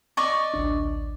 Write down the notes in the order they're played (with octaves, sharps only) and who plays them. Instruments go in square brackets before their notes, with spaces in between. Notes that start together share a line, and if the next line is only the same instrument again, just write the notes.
[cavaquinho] D5 D#5 C#6
[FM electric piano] A1 D2 D4